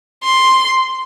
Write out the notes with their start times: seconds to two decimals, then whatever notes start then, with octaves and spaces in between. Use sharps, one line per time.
0.23 C6